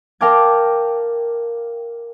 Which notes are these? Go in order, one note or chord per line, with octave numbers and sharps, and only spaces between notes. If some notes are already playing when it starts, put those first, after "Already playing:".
A#4 F5 G5 A5 D6 G#6